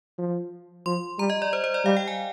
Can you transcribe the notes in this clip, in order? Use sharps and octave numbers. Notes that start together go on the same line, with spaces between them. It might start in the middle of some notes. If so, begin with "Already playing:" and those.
F3
F3 C6
G3 A#5
D#5
D5
C5
C5
D5
G3 F5
G5
G#5